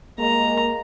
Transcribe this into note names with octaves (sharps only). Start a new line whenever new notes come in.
G#3 A#3 A#4 D#5 A#5